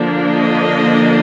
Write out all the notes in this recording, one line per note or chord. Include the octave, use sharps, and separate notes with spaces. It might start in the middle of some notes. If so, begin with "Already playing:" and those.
Already playing: D3 F3 A#3 D4
D#5